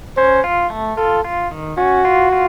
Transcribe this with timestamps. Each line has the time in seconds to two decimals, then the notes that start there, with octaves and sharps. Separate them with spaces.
0.17 C#4 C5
0.44 F4
0.70 A3
0.97 F4 A4
1.24 F4
1.51 D#3
1.77 C#4 F#4
2.05 F4
2.32 F4